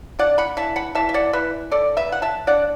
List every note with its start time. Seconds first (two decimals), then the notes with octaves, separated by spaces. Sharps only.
0.19 D4 D5 F#5
0.38 F#5 B5
0.57 E3 E5 A5
0.76 F#5 B5
0.95 E3 E5 A5
1.09 E5
1.14 D5 F#5
1.33 E3 B4 E5
1.71 D3 A4 D5
1.97 B4 E5
2.09 B3 F#5
2.22 E5 A5
2.47 D4 D5 F#5